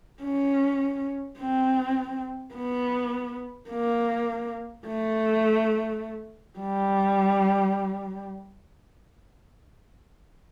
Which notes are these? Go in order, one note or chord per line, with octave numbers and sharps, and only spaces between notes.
C#4
C4
B3
A#3
A3
G3